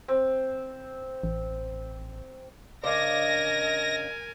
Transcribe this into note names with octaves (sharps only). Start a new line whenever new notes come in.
C4
A1
C#3 D4 A#4 C5 D#5 G#5 A#6